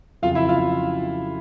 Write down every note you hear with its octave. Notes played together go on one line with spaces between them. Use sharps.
F2 C#3 F#3 F4 F5
E4 E5
F4 F5